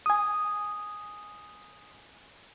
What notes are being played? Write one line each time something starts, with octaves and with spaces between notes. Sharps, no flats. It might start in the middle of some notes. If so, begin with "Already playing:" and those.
G#5 D#6